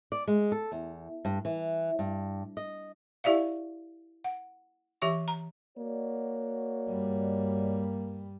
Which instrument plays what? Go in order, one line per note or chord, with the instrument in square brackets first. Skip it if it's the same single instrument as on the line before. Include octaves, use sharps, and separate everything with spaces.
[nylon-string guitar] D5
G#3
A4
E2
G2
E3
G2
D#5
[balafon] E4 G4 D5 E5 F5
F#5
E3 G4 E5 C#6
A#5
[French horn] A#3 [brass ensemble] F#4 C#5 D5
[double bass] G2 G3